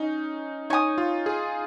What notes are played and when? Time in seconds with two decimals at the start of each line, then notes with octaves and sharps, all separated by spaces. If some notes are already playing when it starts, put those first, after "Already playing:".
Already playing: C#4 D#4
0.70 D#4 C#5 G#5 D#6
0.98 F4
1.26 G#4